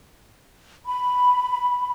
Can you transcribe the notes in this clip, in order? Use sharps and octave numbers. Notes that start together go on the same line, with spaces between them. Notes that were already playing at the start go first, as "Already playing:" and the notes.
B5